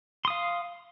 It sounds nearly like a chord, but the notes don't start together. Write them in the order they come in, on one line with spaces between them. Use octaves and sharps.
C6 D#6 F5